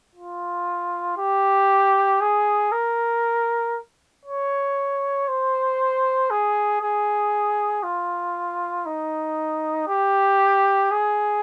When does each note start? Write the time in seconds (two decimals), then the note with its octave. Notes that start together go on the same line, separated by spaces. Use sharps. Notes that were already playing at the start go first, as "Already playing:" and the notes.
0.15 F4
1.18 G4
2.21 G#4
2.72 A#4
4.25 C#5
5.28 C5
6.30 G#4
6.82 G#4
7.83 F4
8.86 D#4
9.88 G4
10.91 G#4